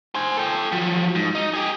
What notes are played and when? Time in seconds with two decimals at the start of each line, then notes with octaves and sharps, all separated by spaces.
0.15 C5 G#5
0.37 A4 G5
0.72 F3 F#3
1.15 G#2
1.35 D#4
1.53 G4 G#4